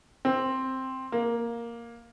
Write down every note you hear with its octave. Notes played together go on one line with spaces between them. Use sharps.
C4
A#3